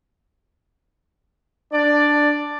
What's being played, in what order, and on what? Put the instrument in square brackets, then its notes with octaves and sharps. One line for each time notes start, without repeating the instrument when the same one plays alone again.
[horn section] D4 D5